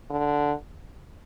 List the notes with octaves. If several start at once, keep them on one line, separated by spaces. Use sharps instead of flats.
D3